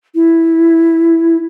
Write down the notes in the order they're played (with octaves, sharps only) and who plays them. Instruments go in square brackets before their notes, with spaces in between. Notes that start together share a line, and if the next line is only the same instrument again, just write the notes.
[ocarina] E4